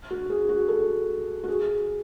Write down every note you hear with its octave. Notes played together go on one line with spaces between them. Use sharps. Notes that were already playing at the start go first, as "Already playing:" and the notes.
F#4
G#4
F#4
A4
F#4
G#4